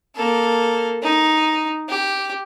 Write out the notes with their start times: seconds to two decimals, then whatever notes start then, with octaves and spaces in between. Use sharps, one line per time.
0.16 A#3 A4
1.02 D#4
1.89 G4